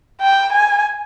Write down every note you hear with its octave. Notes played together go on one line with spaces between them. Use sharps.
G5
G#5